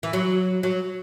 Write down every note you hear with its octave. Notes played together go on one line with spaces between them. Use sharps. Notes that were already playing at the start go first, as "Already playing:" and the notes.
E3
F#3
F#3